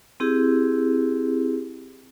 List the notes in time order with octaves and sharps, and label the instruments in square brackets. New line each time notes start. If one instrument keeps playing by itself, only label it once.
[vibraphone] C4 E4 G4 G#4